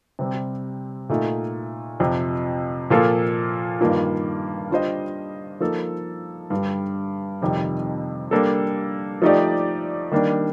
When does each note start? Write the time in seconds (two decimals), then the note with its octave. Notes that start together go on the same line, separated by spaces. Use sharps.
0.19 C3 G3 C4
1.09 A#2 A3 D#4
2.00 F2 C3 F3
2.90 A#2 F3 A#3 F4 A4
3.81 G2 D#3 A#3 D4 F4
4.71 G3 D4 F4 C5 D#5
5.60 F3 A#3 D#4 A4
6.50 G2 D3 G3
7.42 F2 C3 D#3 G3
8.31 G3 A#3 D4 A4
9.22 F3 A3 D#4 G4 D5
10.11 D#3 G3 A#3 D4